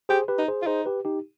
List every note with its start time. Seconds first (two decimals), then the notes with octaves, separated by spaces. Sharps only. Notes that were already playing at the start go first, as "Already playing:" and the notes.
0.09 G4 G#4 C5
0.28 G4 B4
0.39 D#4
0.48 G#4 C5
0.62 F4
0.66 D#4 G#4 C5
0.85 G4 B4
1.05 D#4 G4